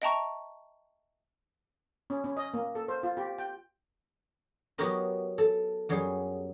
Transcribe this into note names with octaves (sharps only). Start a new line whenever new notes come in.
D#5 E5 G5 A5 A#5 C#6
C#4
C#4
D#5
A#3
A4
C5
F4
G4
G5
F#3 B3 F#4 G4 A#4 D#5
A4
F#2 F#3 G3 G#4